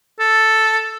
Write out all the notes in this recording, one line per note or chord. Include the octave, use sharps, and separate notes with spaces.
A4